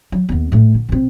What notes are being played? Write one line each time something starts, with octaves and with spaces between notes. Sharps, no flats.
F#3
D#2 B3
A2 A3
D3
B2 C4